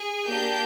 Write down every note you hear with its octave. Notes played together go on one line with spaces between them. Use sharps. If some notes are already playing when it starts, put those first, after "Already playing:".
Already playing: G#4
A#3 D4 G4 G6